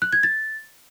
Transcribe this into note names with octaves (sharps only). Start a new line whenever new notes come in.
F#6
G#6
A6